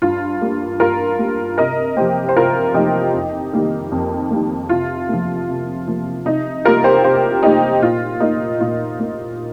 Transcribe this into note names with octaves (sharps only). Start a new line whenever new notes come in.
G2 F4
G3 A#3
G2 F4 A#4
G3 A#3
C3 A#4 D#5
F3 A#3 G4 C5
C5
C3 F4 A#4
F3 A#3 D#4 G4
F2
D#3 G3 A#3
F2
D#3 G3 A#3
C3 F4
F3 A#3
C3
F3 A#3
C3 D#4
G3 A#3 F4 A#4
G4 C5
C3 G4 C5
G3 A#3 D#4 G4
A#2 F4
A#3 D#4
A#2 F4
A#3